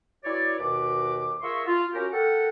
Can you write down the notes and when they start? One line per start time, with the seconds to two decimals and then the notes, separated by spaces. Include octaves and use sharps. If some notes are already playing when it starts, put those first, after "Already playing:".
0.24 E4 F#4 B4 C#5 D5
0.59 D#2 B2 F#4 B4 D6
1.42 F4 G#4 A#4 E5 C6 C#6
1.66 F4
1.94 C#4 F#4 G4 A#4
2.13 A4 A#4 F#5 G5